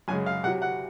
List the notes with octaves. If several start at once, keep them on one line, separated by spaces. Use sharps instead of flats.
F#2 C#3 G#3 G#5
F5
C3 F#3 F#5
F#5